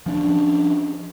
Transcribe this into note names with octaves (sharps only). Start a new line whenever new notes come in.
F3 C#4 D4